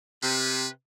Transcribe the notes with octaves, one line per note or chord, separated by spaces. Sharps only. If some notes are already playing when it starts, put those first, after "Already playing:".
C3 B4